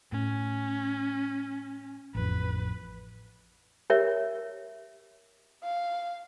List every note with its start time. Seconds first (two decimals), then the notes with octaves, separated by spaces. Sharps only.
0.12 A2 C#4
2.15 A1 F2 B4
3.90 G4 A#4 C#5 E5
5.64 F5